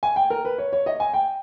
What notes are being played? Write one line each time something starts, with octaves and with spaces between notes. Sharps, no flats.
G#5
G5
A#4
B4
C#5
C#5
D#5
G#5
G5